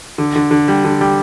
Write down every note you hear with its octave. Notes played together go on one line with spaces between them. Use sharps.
D3
D3
D3
G3
D3
G3